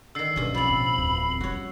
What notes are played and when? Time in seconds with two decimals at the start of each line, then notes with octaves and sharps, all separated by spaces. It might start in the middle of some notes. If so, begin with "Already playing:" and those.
0.15 D3 D#3 E6 C7
0.36 B1 G2 A#2 C#4
0.54 F3 C4 B5
0.69 D1 B2
0.98 D1 E2
1.41 G3 C#4 F#4 C#5